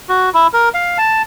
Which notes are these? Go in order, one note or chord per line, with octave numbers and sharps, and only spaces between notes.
F#4
E4
A#4
F5
A5